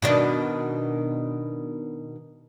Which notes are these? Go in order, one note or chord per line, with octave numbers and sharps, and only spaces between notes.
B2 D#3 D4